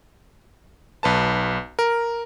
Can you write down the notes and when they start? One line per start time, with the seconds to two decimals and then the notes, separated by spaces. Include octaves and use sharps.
1.03 B1 B4 A5
1.79 A#4